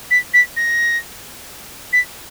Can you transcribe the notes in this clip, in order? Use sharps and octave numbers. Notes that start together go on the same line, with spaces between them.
B6
B6
A#6
B6